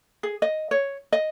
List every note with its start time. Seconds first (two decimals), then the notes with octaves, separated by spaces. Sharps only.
0.23 G#4
0.42 D#5
0.71 C#5
1.12 D#5